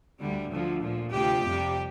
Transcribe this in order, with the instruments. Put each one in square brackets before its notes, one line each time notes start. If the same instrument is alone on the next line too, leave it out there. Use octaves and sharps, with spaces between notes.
[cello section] D2 D3 G3
D2 D3 F3
A#2 F3
D2 C3 F3 G4
F2 C3 G3